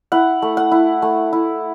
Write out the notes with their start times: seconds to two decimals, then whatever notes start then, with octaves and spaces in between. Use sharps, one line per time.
0.12 E4 F#5
0.42 A3
0.57 F#5
0.72 E4
1.02 A3
1.33 E4